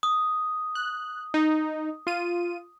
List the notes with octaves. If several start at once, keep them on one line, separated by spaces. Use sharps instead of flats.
D#6
F#6
D#4
F4 D#7